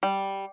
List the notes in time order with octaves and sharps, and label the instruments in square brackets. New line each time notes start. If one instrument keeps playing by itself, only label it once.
[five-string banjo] G3